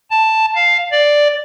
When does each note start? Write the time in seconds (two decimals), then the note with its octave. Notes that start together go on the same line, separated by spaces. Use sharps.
0.11 A5
0.55 F5
0.92 D5